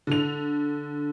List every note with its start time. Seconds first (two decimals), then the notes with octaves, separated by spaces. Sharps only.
0.07 D3 F7